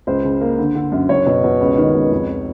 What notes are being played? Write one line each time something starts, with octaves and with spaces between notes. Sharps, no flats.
C#2 C5
C#3
A#3
D3
D3
F#2
F#1 C#5
B2
B2
C#2
D#3
C#2
F2